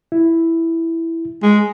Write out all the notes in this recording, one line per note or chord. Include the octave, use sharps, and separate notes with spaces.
E4
G#3